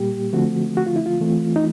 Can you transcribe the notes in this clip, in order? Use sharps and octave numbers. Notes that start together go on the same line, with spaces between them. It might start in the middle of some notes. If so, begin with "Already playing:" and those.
Already playing: A#2 G3 A#3 G4
D3 F3 A3 C4 F#4
F#4
F4
E4
F4
E3 A3 C4
D#4